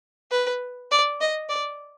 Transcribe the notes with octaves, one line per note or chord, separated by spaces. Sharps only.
B4
D5
D#5
D5